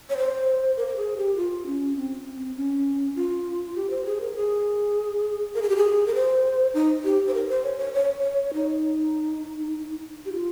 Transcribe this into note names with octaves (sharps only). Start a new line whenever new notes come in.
C#5
C5
A#4
A#4
G#4
G4
F4
C#4
C4
C4
C#4
F4
G4
C5
G#4
A#4
G#4
A#4
G#4
G4
G#4
A#4
C5
D#4
G4
C5
A#4
C5
C#5
C#5
C#5
C#5
D#4
G4
F4